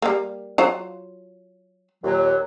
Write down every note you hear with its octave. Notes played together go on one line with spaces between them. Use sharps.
G3 A#3
F#3 F4 C5
D#2 A#2 F#3